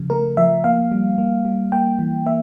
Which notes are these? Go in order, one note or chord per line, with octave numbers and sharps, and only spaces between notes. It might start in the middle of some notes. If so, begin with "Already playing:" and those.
Already playing: C#3 F3
A3 A#4
F3 E5
A#3 F5
G3
A#3
G3
A#3 G5
E3
A#3 E5